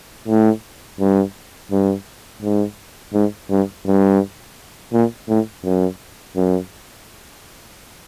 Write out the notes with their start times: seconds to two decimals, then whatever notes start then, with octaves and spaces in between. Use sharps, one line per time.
0.28 A2
1.00 G2
1.71 G2
2.43 G#2
3.14 G#2
3.51 G2
3.87 G2
4.93 A#2
5.29 A2
5.64 F#2
6.36 F#2